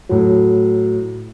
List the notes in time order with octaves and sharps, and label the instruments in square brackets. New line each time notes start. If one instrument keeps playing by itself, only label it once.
[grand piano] A2 F#3